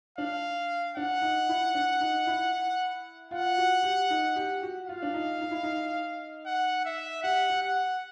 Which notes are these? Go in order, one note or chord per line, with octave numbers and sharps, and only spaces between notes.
D4 F5
D4 F#5
D#4
E4
D4
D#4
E4
F4 F#5
F#4
G4
D#4
G4
F#4
F4 F5
D4
D#4
D#4
E4
D#4
F#5
E5
G4 F#5
G4
F#5